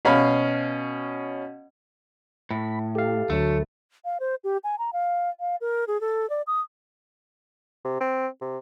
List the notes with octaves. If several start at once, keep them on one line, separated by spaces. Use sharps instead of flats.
B2 C#4 F5 B5
A2 B5
G4 A4 F5
D2 D3 F#3 A3
F5
C5
G4
G#5
A#5
F5
F5
A#4
G#4
A4
D5
D#6
C3
C4
C3